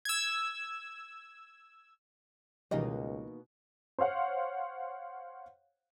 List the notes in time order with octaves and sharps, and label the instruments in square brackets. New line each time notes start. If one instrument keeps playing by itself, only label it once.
[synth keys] E6 G#6
[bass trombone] C#2 [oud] B2 A#3 D#4 [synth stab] D#3 E3 G3 [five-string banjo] D#5
[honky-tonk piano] C5 C#5 F5 F#5